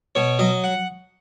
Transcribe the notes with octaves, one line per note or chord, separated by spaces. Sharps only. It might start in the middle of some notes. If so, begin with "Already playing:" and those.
B2 C#5
F#3 D#5
F#5